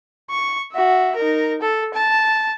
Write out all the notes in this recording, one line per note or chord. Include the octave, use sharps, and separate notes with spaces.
C#6
F#4 E5
D#4 A#4
A4
A5